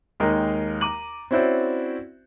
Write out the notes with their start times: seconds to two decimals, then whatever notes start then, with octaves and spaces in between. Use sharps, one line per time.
0.20 D#2 G#3 D#4 A#4 G5
0.81 A#5 D6 D#7 F#7
1.31 C4 C#4 E4 F#4 C5 D5